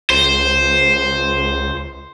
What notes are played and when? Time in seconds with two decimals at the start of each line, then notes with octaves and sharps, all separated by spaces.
0.10 C#2 C5